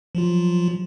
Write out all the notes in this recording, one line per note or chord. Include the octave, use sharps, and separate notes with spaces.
F3 F#3 F4